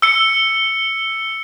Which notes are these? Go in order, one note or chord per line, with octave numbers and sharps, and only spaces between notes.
E6 C#7